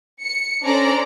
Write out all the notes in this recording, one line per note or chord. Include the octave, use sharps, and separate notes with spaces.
C#7
C#4 D4 A4 C5 D5 A#5